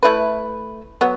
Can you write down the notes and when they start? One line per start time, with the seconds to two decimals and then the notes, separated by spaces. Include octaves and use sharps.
0.03 A3 E4 B4
1.01 F#3 B3